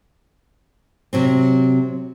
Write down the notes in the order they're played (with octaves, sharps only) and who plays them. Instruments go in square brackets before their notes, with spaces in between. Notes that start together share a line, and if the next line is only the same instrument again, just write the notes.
[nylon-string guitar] C3 F#3 C4